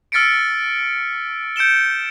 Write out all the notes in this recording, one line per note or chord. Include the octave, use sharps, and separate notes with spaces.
E6 F6 A6 B6 C#7 D7
G6 C#7 D7 E7 G7